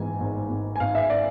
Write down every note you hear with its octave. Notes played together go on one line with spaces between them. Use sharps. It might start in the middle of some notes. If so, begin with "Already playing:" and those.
Already playing: G#2 E3 G#5
G#1
G#1
G#5
G#1 F5
E5
D5